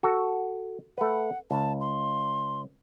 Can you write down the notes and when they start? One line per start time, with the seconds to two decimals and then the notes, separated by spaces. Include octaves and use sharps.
0.03 F#4 A4
0.98 A3 B4 F#5
1.51 C#2 A5
1.81 C6